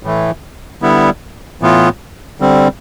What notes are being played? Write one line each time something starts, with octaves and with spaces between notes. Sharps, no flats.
A2 E3 A3
D3 G3 B3 E4
A2 E3 B3 F4
D3 G3 C4